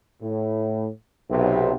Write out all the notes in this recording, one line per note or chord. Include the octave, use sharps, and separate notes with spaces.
A2
B1 C3